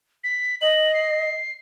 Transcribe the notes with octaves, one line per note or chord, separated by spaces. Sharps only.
B6
D#5 F#7
C7